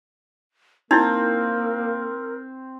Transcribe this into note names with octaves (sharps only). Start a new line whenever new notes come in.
A#3 C4 D#4 E4 A#4